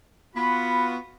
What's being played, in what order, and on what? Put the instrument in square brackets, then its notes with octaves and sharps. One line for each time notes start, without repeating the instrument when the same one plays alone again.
[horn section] B3 F4 F#4 [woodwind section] B5